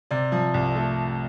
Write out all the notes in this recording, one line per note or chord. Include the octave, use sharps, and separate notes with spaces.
C3 D5
F3
C2
A3